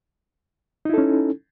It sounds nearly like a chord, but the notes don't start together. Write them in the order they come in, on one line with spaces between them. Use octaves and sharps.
D#4 E4 A4 C#4